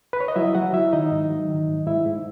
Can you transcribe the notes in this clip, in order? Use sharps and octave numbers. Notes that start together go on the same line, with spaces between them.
B4
C#5
D#5
F#3 E4 E5
F#3 F#4 F#5
F#3 E4 E5
D#3 D#4 D#5
G#2
F#3
D#3
G#2
G#2 E4 E5
G#2